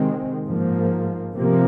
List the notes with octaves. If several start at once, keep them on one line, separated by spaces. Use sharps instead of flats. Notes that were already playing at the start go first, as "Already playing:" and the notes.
Already playing: C3 D#3 G#3 C4
G#2 F3 A#3
C3 F3 A#3